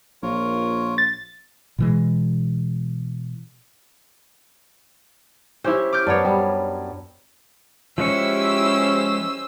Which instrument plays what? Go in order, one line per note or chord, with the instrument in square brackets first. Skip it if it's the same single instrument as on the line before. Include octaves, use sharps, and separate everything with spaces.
[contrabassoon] A#1 [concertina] F4 A#4 C#5
[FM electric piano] A6
[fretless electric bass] B2 E3 G#3
[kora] C#4 [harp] E4 G4 C5
[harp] D6 F6 G6
[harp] F#2 C#5 [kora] B3 D4
[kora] G3
[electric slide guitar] F3 G#3 C#5 [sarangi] C#4 [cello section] E4 G4 [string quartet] C5 E6